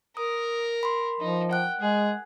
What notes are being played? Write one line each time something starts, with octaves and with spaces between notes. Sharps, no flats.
A#4 D#6
B5 C6
F3 D#4
F#5 G5 F#6
G#3 G#4